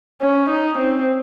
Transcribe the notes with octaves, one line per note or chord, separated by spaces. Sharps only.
C#4
D#4
C4